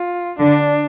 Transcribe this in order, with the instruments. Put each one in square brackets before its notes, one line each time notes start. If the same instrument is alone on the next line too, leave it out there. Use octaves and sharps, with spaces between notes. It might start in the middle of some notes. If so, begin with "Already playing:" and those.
Already playing: [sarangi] F4
[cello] D3 [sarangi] D4